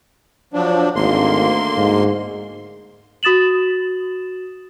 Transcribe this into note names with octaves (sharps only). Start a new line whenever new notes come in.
F3 F#3 D4
G#1 D2 A#3 C6
G#2
F#4 D#6 A6 E7 F#7